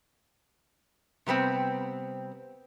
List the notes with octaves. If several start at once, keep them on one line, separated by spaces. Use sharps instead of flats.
C3 G3 B3 C4